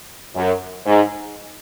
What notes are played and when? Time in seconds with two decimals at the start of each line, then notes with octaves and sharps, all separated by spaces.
0.36 F#2
0.86 G#2